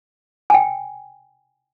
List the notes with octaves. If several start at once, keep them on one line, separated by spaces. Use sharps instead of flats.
G5 G#5